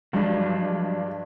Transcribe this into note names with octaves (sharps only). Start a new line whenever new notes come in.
G2 F3 F#3 G#3 D4